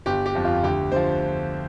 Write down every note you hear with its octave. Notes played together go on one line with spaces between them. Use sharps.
G1 G4
G4
F2 F3
F4
D2 G4
D3 F3 C5